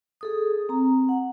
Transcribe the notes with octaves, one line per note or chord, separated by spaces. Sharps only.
G#4 A4 D#6
C4 A#5
F#5